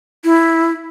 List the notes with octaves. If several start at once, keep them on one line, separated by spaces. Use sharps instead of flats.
E4